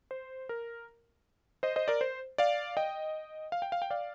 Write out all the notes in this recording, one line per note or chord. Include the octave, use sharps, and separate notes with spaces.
C5
A#4
C5 D#5
C5 D#5
A#4 D5
C5
D5 F5
D#5 G5
F5
G5
F5
G5
D5 F5